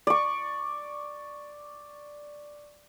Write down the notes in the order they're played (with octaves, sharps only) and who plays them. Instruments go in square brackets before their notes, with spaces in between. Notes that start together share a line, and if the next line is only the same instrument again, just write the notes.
[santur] D5 C#6